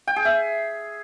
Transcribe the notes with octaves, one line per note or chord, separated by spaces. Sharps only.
G5
G#4
E5